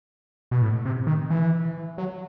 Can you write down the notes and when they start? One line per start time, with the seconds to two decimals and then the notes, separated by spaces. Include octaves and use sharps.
0.51 B2
0.62 A2
0.85 C3
1.07 D#3
1.30 E3
1.98 F#3